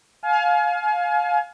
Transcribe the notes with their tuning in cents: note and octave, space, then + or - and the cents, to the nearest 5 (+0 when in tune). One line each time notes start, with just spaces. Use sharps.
F5 +15 G#5 +35